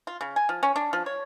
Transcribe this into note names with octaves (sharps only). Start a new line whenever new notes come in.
F4
C#3
G#5
F3
C#4
D4
F3
C#5